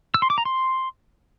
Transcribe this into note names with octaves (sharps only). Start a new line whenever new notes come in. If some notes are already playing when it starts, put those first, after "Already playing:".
E6
C6
D6
A#5
C6